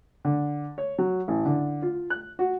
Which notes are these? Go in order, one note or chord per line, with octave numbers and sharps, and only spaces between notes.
D3
C#5
F#3
A1
D3
F4
F#6
F#4